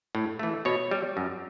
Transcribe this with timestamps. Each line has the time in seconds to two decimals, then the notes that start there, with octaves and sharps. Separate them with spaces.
0.15 A2
0.39 E3 A3
0.65 B2 C#5
0.91 G3
1.17 F#2